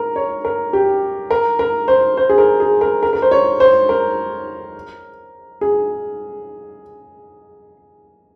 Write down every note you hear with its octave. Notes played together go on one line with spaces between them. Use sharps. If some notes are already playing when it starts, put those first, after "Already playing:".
Already playing: A#4
C#5
A#4
G4
A#4
A#4
C5
C5
G#4
A#4
G#4
A#4
A#4
A#4
C5
C#5
C5
A#4
G#4